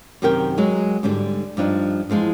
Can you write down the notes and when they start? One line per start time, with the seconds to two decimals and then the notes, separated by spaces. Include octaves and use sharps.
0.22 F#2 C3 D#3 G4 A#4 G5
0.58 F#3 G#3 G#4
1.03 G#2 D3 G3 D4
1.57 G2 F3 D4 D#4
2.10 E2 F3 G#3 F4